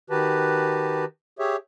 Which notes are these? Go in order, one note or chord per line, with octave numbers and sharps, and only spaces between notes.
D#3 F#4 G4 B4 A5
G4 G#4 C#5 E5